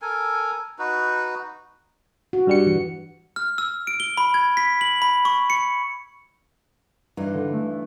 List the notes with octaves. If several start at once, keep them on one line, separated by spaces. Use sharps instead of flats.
A4 A#4 G#5
D#4 F#4 B4
F#4
G2 G3 C#7
E3
F6
E6
D7
G7
B5
G#6
B6
F#7
B5
C#6
C#7
G2 E3 D#4
D3
A3